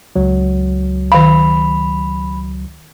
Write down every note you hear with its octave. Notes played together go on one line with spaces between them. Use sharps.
C#2 F#3
D#3 F5 B5